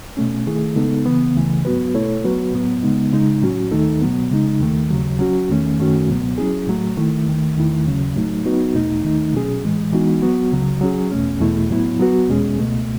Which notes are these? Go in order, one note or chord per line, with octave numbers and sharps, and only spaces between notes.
B2 A3 C#4
D#3 A3 E4 G#4
C#3 G#3 B3 D#4 A4
C#3 E3 B3
C#2 C#3 E3 A3
G#2 F#3 B3 F#4 B4
B2 A3 E4 A4 C#5
F#3 B3 F#4 B4
A2 F#3 B3
C#3 G#3 B3 D#4
C#3 G#3 D#4
A2 F#3 C#4 F#4
D#2 D#3 A3 D#4 A4
B2 F#3 B3
C#3 G#3 D#4
D#2 D#3 A3
D#2 C#3 F#3
F#3 C#4 F#4
E2 D#3 A3 C#4
F#2 D#3 A3 C#4 F#4
C#2 B2 F#3 B3
F#3 C#4 E4 G#4
A2 F#3 A3
D#3 A3 E4
D#2 D#3 A3
E2 D#3 A3 E4
D#2 C#3 F#3 C#4
A2 F#3 A3 D#4
F#3 B3 D#4 F#4 B4
E2 B2 A3 D#4
D#2 D#3 A3 D#4
B2 F#3 C#4 G#4
A2 E3 G#3
E3 G#3 B3 D#4 F#4
F#3 B3 F#4
C#2 C#3 F#3
F#3 C#4 G#4
E2 B2 A3 C#4
E2 B2 A3 E4
A2 F#3 B3 E4
F#3 B3 F#4 B4
E2 B2 G#3 C#4 G#4
C#2 B2 A3